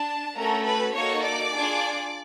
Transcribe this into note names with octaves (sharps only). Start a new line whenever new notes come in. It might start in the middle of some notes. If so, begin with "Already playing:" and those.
Already playing: D4 A5
A3 C#4 F#4 A4 A#4 A#5
B4 B5
A#3 D#4 F#4 A4 C#5 C#6
D5 D6
D4 F4 G#4